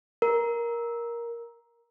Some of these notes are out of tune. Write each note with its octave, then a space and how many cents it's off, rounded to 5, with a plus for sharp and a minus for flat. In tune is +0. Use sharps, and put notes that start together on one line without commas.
A#4 +10